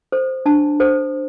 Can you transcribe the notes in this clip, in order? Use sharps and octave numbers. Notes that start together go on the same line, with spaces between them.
A4 C5
D4 A5
A4 C5